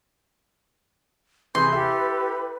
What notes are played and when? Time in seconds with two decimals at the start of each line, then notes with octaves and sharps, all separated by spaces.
1.55 C3 E3 G#4 B4 C6 G6
1.72 E4 G4 A4 E5